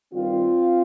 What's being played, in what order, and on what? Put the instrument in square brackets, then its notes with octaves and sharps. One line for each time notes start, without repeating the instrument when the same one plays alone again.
[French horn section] G2 D#3 G3 C4 F4